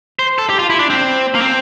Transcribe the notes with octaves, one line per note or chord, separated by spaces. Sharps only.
C5
A4
G4
F4
E4
D4
C4
A#3
C4